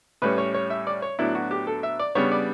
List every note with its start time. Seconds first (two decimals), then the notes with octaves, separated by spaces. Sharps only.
0.22 A2 G3 C#4 B4
0.38 C#5
0.54 C#5
0.70 E5
0.87 D5
1.02 C#5
1.19 A2 F#3 B3 D4 E4
1.35 F#4
1.51 G4
1.67 A4
1.83 E5
1.99 D5
2.15 C#3 G3 B3 D4 C#5
2.32 D5